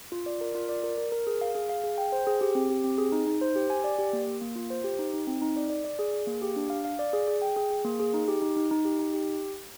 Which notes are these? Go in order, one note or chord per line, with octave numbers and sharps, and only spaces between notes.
F4
D5
A#4
F4
D5
A#4
A#4
A#4
G#4
F5
G#4
F5
G#4
G5
C5
G#4
G4
C4
G4
C4
G#4
D#4
D#4
C5
G4
G#5
D5
G4
A#3
A#3
A#3
F4
C5
G4
D#4
D#4
C4
D#4
D5
D5
D5
G#4
G#4
A#3
G4
D4
F5
F5
D5
G#4
G#4
G5
G#4
G#4
A#3
G#4
D#4
G4
D#4
D#4
D#4
G4
D#4
G4